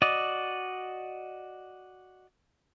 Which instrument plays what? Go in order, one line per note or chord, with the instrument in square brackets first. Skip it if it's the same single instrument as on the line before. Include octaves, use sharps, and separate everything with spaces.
[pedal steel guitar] F#4 D5 D#5